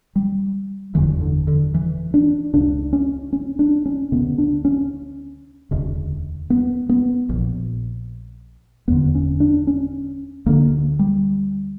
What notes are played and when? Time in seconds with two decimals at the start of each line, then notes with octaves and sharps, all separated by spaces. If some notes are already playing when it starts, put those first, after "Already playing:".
0.16 G3
0.95 F#1 E2 D3 E3
1.21 D3
1.47 D3
1.75 E3
2.14 D4
2.54 C#2 C#3 D4
2.93 C#4
3.33 C#4
3.59 D4
3.86 C#4
4.12 D2 C#3 B3
4.38 D4
4.65 C#4
5.71 E1 D2 C#3
6.50 B3
6.89 B3
7.29 A#1 A#2
8.88 F#1 E2 D3 B3
9.15 C#4
9.40 D4
9.67 C#4
10.46 D2 D3 A#3
10.99 G3